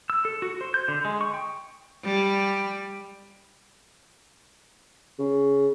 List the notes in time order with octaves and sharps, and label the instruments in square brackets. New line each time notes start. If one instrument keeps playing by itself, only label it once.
[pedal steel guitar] E6
A4
F#4
C5
G6
D3
G#3
C#6
G5
[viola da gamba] G3
[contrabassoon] C#3